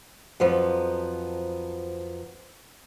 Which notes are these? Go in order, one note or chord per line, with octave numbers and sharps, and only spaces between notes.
F2 F3 F#3 B3